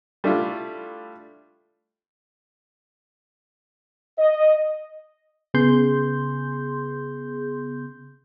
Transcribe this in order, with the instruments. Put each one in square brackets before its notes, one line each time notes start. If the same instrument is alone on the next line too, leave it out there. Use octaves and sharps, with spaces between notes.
[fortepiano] G3 A3 D4 E4 F4
[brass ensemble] D#5
[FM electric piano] C#3 B3 G#4 C6 G6